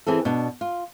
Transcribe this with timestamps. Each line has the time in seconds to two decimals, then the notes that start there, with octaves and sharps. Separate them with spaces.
0.07 E3 C4 G#4 A4
0.25 B2 D4
0.61 F4